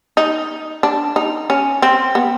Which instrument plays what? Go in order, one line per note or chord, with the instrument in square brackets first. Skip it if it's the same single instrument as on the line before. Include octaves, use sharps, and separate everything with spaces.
[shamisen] D#4
D4
D#4
C#4
C4
B3